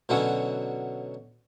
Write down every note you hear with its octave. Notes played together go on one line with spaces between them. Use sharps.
B2 D3 F#3 C#4 E4 F#4